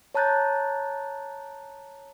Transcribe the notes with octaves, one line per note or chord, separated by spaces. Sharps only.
C#5 A5 A#5 F#6 G6 A6